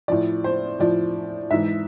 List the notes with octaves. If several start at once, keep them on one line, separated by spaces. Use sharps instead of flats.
A2 F3 D5
C5
A2 F3 D5
G#2 E3 E5